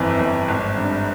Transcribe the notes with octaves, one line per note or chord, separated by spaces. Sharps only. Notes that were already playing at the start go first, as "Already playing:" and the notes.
Already playing: G1 F2 E3
G1
G#1
G2